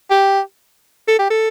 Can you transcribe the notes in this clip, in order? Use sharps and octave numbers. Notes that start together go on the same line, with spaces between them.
G4
A4
G4
A4